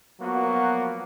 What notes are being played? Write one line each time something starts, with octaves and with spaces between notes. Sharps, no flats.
F3 F#3 A#3 B3 F#4